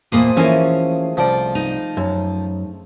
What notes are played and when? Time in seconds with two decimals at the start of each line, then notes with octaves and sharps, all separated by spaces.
0.12 E2 A#2 F3 G#3 A#3 D#6
0.37 E3 F3 A3 A#3 C#4 G#4
1.17 C2 F3 D5
1.55 D#4
1.97 F#2